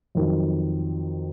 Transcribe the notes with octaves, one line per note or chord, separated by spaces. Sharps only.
F2 D#3 F#3